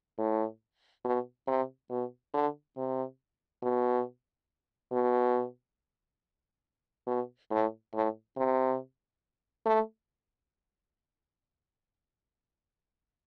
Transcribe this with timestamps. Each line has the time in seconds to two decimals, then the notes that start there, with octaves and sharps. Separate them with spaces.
0.18 A2
1.05 B2
1.48 C3
1.90 B2
2.34 D3
2.77 C3
3.62 B2
4.92 B2
7.07 B2
7.51 A2
7.94 A2
8.37 C3
9.66 A3